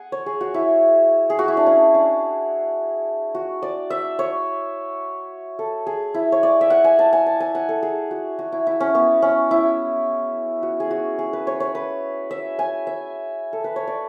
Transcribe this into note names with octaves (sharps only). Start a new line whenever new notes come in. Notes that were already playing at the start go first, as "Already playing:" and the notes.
Already playing: G#4 F#5 G#5
C#5
G#4
F#4
E4
G#4
F#4
E4
D4
C#4
D4
F#4
D5
E5
C#5
A4
G#4
E4
C#5
D5
E5
F#5
G#5
A5
G#5
A5
G#5
F#5
A4
G#4
F#4
F#4
E4
E4
C#4
B3
C#4
E4
F#4
G#4
F#4
G#4
B4
C#5
C#5
B4
E5
G#5
E5
A4
B4
C#5
D5